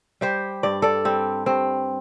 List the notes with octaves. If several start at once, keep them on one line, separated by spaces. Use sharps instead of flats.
G3 G4 C5
G2 D5
A4 D5
G3 C4
G2 C4